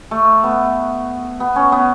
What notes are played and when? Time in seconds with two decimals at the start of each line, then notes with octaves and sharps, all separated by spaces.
0.11 A3
0.44 B3
1.40 B3
1.56 C#4
1.72 B3